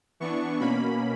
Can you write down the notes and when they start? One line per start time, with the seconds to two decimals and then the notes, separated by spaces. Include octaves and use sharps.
0.20 E3 B3 D4 C#6
0.60 B2 A#3 C#4 B5